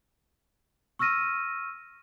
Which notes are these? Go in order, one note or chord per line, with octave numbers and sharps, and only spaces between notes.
C#6 E6 F6 A#6 D#7